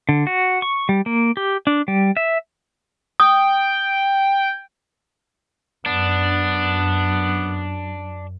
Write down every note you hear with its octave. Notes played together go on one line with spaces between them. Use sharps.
D3
F#4
C#6
G3
A#3
G4
D4
G3
E5
G5 D#6
F#2 B3 D4